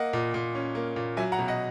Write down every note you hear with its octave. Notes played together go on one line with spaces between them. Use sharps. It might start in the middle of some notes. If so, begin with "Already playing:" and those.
Already playing: A#3 D#5 F#5
A#2
A#2
C#4
A#3
A#2
F#3 E5 G#5
F#5 A#5
B2
D#5 F#5